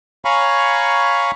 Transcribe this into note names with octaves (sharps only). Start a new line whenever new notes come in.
C#5 F5 G#5 A#5 B5 C#6